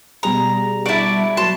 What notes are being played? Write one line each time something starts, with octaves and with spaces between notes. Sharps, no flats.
B2 G3 G#4 A#5
E4 F#4 D5 A5
F#3 A#3 A5 C6